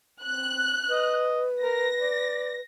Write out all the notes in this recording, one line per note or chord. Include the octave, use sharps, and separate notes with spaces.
C4 F#6
B4 D#5
A#4 A#6
D5